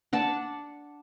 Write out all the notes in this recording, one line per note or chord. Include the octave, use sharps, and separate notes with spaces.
D4 F#5 A5